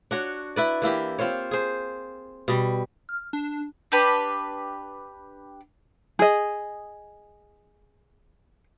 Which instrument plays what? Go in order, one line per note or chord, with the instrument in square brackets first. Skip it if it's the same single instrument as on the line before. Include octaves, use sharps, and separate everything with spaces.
[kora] D4 F#4 C#5
E4 B4 D5
E3 A#3 E4 G4
C4 F4 C5 C#5
G#4 C5
B2 G3
[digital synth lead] F6
D4
[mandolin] D4 G4 B4
[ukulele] G#4 D#5